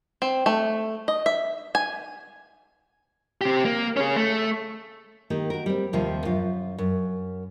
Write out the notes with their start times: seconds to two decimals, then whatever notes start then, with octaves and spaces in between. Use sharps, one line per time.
0.22 C4
0.46 A3
1.08 D#5
1.26 E5
1.75 G#5
3.41 C4 G4
3.65 A#3
3.97 C#4 G#4
4.16 A3
5.30 D#3 A#3 G4
5.50 F#4 A#4
5.66 G3 C4
5.93 D#2 C3 F3 G3 C4
6.25 F#2 F4
6.78 F#2